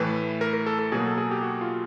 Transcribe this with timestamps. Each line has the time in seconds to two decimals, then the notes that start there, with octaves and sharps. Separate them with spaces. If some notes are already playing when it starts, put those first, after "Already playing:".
Already playing: A2 E3 A3 B4
0.41 A#4
0.54 A#4
0.66 A4
0.79 A4
0.92 B2 F#3 A#3 G#4
1.05 A4
1.18 G#4
1.31 G4
1.43 F#4
1.61 F4